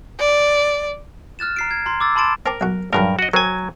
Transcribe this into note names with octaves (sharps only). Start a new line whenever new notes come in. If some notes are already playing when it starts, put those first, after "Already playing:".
D5
F6 F#6 A6 E7
A#5 C7 D7
G#6
A#5 C6
D6 E6 A6
A5 B5 C6 A6 D7 E7
C4 A#4 A5 D6
B1 F#4
G2 A#2 C#3 F#3 A#4
F#4 D#5
F#3 C4 A#4 G#5